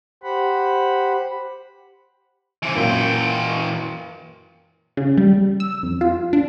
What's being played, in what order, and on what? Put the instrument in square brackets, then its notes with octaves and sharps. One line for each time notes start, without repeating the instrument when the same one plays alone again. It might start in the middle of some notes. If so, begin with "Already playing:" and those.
[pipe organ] G4 C5 F#5 B5
[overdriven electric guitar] C3 E3
[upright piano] F#2 A#2 [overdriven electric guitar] E3 G5
[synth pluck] C#3
G3
E6
F2
F4
D4